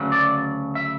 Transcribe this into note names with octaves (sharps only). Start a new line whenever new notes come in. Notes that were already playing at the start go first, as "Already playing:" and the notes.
Already playing: D2 C#3 F#3
D5
E5